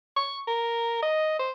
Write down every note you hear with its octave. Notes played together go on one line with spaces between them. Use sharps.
C#6
A#4
D#5
C5